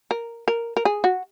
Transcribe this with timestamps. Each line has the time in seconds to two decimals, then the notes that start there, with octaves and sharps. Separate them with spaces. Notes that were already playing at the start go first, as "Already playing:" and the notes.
0.11 A#4
0.48 A#4
0.77 A#4
0.85 G#4
1.04 F#4